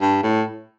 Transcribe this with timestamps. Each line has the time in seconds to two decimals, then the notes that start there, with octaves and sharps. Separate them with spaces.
0.01 G2
0.23 A2